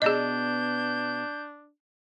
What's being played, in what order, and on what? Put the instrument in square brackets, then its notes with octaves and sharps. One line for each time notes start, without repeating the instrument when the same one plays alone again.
[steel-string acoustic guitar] B2 B3 [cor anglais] D4 [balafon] G#4 D5 D#5 [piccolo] G6